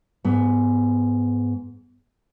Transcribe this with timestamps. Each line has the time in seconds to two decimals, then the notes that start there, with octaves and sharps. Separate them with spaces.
0.24 G#2 B3